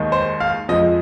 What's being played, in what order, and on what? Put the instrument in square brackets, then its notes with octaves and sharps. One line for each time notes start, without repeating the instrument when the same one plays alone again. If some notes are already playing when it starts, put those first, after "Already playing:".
Already playing: [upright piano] D#2 D#3 G#3
C5
F5
F2 F3 G#3 D#5